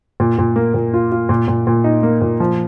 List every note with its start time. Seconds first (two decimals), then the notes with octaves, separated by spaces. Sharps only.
0.20 A#2
0.39 A#2
0.56 A#3
0.74 A#2
0.94 F4
1.12 F4
1.29 A#2
1.48 A#2
1.67 A#2
1.84 D#4
2.03 A#3
2.22 A#2
2.40 F3